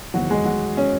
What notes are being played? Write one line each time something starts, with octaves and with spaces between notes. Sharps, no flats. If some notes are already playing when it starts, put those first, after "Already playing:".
F#1 E2 D#3 F#3 F#4
G#3 G#4
F#3 F#4
C#4